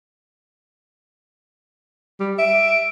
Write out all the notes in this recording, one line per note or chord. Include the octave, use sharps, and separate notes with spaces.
G3
E5 D7